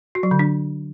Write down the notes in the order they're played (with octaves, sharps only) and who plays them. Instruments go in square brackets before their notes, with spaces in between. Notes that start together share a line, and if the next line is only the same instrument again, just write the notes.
[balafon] F#4
F#3
D3
D4